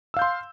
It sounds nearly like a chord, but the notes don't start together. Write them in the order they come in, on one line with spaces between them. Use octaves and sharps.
E6 F5 G6 C6